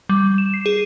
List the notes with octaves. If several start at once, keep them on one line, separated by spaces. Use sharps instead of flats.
G3
E7
C7
G#4